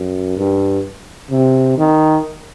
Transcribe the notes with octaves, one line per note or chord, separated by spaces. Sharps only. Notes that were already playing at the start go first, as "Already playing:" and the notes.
Already playing: F#2
G2
C3
D#3